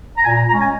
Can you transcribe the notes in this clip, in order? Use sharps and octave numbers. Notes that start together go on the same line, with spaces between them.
A#5
A#2 G#5
A#5
G#3 C#4 A#5
G#5